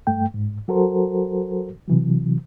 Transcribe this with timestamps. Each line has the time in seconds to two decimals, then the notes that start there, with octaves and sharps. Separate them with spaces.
0.07 G2 A3 G5
0.34 G#2
0.68 F#3 F#4 A4 A#4 C5
1.88 C3 E3 F#3